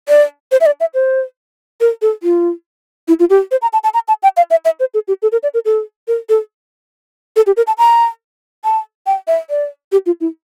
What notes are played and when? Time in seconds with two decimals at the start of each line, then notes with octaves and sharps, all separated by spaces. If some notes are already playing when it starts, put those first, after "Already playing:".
0.09 D5
0.52 C5
0.61 E5
0.66 D5
0.80 E5
0.94 C5
1.81 A#4
2.02 A4
2.23 F4
3.08 E4
3.19 F4
3.30 G4
3.51 C5
3.62 A#5
3.73 A5
3.84 A5
3.94 A#5
4.08 A5
4.23 G5
4.37 F5
4.51 E5
4.65 E5
4.80 C5
4.94 A4
5.08 G4
5.22 A4
5.32 A#4
5.43 D5
5.54 A#4
5.65 A4
6.08 A#4
6.29 A4
7.36 A4
7.47 G4
7.57 A#4
7.67 A5
7.78 A#5
8.64 A5
9.06 G5
9.27 E5
9.50 D5
9.92 G4
10.06 F4
10.21 E4